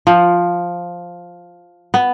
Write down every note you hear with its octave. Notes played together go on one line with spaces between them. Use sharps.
F3
B3